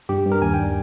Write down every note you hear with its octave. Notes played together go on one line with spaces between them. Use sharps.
G2 G4
G2
A#4
D#2 G#5
G5
G3